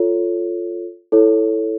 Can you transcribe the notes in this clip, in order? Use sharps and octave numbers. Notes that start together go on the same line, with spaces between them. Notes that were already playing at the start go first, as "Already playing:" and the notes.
Already playing: F4 A4 C#5
E4 A4 C#5